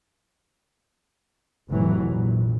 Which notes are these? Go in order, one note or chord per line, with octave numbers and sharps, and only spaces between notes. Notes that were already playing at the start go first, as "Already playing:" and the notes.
F1 A2 E3 F#3
A#1